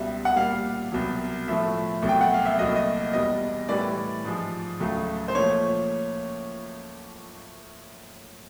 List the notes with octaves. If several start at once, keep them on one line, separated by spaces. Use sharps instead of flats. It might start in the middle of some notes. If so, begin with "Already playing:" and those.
Already playing: C#2 B2 G3 E5
F#5
A#2 G3 F5
C2 B2 F#3
A2 F3 A3 E5
C2 B2 F#3 A3
G5
F#5
F5
E5
C2 A#2 F#3 A3 D#5
D#5
E2 B2 G3 D#5
A2 E3 G3 D5
G#2 F3 G#3
C#2 C#3 F#3 A3
C5
A#2 F3 A3 C#5